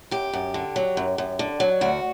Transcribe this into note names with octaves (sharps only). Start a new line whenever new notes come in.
F#2 G4
F#2
D3
F#3
F#2
F#2
D3
F#3
D2 F#4